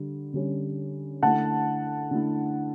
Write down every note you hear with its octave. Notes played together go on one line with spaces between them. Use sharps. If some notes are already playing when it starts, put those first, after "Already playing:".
Already playing: D3 G3
D3 G3 C#4
D3 A3 E4 F#5 A5
D3 A3 E4